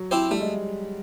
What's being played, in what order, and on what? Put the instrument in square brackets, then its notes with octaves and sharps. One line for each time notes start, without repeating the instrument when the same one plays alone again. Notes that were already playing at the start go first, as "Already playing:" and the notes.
Already playing: [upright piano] F#3
[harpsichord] C4 E4 G4 C5
[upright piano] G3 [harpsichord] A3
[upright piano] G#3